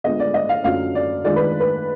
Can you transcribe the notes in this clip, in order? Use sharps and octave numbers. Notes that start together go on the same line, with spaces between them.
D3 G#3 B3 F4 D#5
D5
D#5
F5
F#2 D3 F#3 D4 F4 F5
D5
D#3 G#3 D4 F4 D5
B4
B4